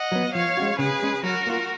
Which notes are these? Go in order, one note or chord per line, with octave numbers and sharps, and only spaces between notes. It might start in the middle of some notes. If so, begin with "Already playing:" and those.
Already playing: D#5 F#5
F#3 B3
F3 C#5 F5
G#3 C#4 F#4
C#3 G#4 B4
G#3 C#4
F#3 F#4 A#4
A#3 F4